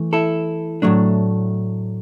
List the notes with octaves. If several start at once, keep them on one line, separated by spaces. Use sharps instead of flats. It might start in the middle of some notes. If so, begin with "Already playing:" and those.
Already playing: E3 A3
E4 A4
A2 F#3 A3 D4